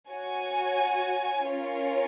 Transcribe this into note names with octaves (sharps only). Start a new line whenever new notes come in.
F#4 C#5 G#5
C#4 F4 A#4 C#5